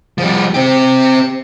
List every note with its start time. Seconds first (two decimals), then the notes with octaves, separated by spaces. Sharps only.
0.18 F3 G3
0.54 C4 G4